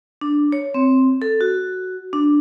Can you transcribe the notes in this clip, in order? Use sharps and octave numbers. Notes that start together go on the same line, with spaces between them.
D4
C#5
C4
A4
F#4
D4